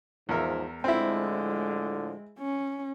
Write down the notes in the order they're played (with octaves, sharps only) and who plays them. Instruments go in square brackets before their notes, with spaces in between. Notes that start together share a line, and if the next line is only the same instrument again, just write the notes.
[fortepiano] E2 A#4 E5 [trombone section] G#2 F3
[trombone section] A2 D3 F3 [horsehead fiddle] G#3 [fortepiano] C4 E4
[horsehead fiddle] C#4